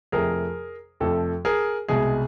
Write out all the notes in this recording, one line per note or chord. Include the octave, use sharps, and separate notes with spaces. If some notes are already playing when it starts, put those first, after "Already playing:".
F2 C3 F3 A3 G#4 A#4
F2 C3 F3 A3 A4
G#4 A#4
C2 B2 G#3 G#4